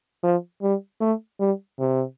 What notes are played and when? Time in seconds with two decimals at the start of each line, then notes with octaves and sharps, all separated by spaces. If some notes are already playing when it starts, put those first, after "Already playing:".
0.23 F3
0.62 G3
1.01 A3
1.40 G3
1.79 C3